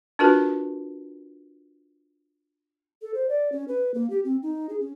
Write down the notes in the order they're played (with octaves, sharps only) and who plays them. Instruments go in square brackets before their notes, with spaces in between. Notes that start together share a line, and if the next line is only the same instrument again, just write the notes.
[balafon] D4 F4 F#4 A#4 B4
[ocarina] A4
C5
D5
C#4
B4
A#3
G4
C4
D#4
G#4
C#4